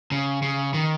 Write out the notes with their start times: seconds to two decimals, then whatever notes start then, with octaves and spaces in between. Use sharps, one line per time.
0.11 C#3
0.42 C#3
0.74 D#3